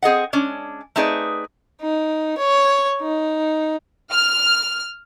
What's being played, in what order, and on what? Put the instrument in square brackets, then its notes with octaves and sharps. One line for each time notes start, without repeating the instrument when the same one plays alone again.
[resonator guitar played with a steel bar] C4 G#4 D#5 F#5
G#3 C#4 D4
A3 C4 D#4 G#4 B4 D5
[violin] D#4
C#5
D#4
[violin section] F6